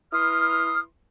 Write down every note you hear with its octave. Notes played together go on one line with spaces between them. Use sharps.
E4 B4 C6 D#6 F6